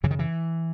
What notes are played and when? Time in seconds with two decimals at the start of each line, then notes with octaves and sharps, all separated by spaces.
0.03 F#2 C#3 E3
0.11 D#3
0.19 E3